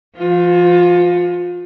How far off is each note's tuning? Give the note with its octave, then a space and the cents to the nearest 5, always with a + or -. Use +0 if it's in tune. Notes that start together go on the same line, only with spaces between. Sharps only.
F3 -35 F4 +25